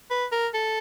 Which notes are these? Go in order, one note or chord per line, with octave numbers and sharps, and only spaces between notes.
B4
A#4
A4